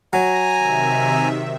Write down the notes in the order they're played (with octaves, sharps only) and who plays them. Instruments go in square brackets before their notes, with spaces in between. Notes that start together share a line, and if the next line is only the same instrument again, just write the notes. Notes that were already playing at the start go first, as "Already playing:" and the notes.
[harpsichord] F#3 [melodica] G#5 A#5 [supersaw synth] A#6
[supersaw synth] C3 D#3 E5